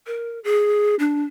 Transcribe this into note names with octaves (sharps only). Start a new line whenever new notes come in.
A#4
G#4
D4